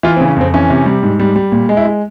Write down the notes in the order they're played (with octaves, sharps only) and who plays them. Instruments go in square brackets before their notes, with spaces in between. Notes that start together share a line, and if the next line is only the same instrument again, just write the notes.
[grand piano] E3 F4
C4
C#3
C#4
F2 C4
E3 C#4
C3
G3
G#2
G3
G3
A#2
G#3
E4
G#3